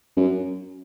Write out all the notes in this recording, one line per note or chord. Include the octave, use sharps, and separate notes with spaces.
F#2